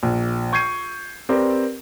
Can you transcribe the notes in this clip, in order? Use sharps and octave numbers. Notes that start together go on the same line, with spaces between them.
A#1
C#6 G6 G#6 C7 D#7
C4 G4 A#4 B4 D5